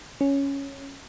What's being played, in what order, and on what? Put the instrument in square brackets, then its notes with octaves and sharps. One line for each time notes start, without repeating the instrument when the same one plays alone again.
[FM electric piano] C#4